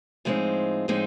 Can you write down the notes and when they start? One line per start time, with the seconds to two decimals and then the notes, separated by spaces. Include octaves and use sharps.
0.25 A2 F3 G#3 C4 D#4
0.88 A2 F3 G#3 C4 D#4